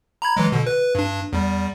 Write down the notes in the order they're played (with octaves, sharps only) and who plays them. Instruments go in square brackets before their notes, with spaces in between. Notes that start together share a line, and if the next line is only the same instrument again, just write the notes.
[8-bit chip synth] A#5 B5 G#6
E3 F#3 G#3
B2 D3
B4
G2 D4
E2 G3